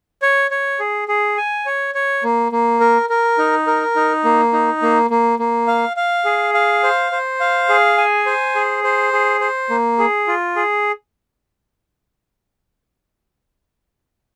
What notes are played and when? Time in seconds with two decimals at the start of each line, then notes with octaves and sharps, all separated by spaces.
0.22 C#5
0.51 C#5
0.80 G#4
1.08 G#4
1.37 G#5
1.66 C#5
1.95 C#5
2.23 A#3
2.52 A#3
2.80 A#4
3.10 A#4
3.38 D#4
3.67 A#4
3.96 D#4
4.24 A#3
4.53 D#4
4.82 A#3
5.10 A#3
5.39 A#3
5.68 F5
5.97 F5
6.25 G#4
6.54 F5
6.83 C5
7.12 C5
7.40 F5
7.69 G#4
7.97 G#5
8.26 C5
8.55 G#4
8.84 C5
9.13 G#4
9.41 C5
9.70 A#3
9.99 G#4
10.27 F4
10.56 G#4